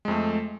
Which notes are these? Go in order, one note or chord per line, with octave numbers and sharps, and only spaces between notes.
F2 G#3 A3